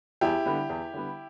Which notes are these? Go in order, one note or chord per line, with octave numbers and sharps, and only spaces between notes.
E2 E4 G4
D3 G3 B3
E2
D3 G3 B3